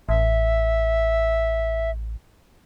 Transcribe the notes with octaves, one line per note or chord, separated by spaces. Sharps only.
A1 E5